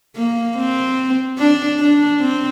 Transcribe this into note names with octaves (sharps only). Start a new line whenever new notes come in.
A#3
C4
D4
D4
C4